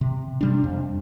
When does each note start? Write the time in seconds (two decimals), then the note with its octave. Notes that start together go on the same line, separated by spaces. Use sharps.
0.01 C3
0.41 C3 G3 D4
0.64 F2